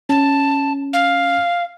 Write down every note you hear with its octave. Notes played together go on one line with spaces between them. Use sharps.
C#4 A5
F5